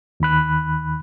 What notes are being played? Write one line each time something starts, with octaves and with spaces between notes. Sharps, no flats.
D#2 D#3 B5 F#6